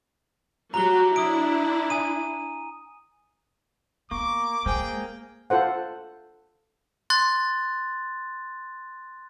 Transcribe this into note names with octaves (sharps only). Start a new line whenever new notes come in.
F#3 F#4 G4 A#5 G7
D4 E4 D#6 D7
G#5 D#6 D#7
A#3 B3 C#6 D6
G#3 A#3 G#4 C5 G5 G#5 D6
F4 A4 C5 F#5
C6 F#6 A6